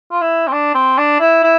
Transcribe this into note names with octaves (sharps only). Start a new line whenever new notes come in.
F4
E4
C4
D4
C4
D4
E4
E4